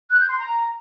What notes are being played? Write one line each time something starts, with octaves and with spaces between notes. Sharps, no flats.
F#6
G6
C6
A#5